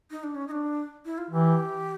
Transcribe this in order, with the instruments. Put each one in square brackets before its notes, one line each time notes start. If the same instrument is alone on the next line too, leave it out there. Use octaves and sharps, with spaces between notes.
[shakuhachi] D#4
D4
C#4
D#4
D4
E4
F4
[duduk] E3 [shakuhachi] G4